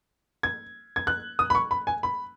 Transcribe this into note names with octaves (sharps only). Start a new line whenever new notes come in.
G#6
G#6
F#6
D#6
B5
C#6
B5
G#5
B5